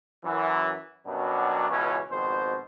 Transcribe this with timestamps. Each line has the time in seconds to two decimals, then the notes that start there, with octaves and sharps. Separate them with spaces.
0.25 F#2 E3
1.07 F#2 B2 F#3 G3 D4
1.70 C#2 B2 E3 C#4
2.11 G#1 F2 B2 C5